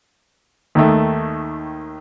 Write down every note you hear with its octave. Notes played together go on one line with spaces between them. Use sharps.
D#2 D#3 A3